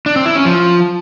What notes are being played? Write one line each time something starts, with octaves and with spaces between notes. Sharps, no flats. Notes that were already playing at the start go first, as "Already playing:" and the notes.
D4
C4
E4
C#4
F3